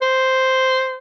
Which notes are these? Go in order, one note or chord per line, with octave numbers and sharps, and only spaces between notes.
C5